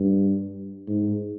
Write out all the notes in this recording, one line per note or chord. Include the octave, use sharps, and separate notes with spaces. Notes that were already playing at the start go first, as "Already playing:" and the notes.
Already playing: G2
G#2